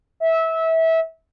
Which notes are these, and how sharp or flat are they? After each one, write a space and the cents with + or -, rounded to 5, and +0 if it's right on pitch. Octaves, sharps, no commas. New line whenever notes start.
E5 -20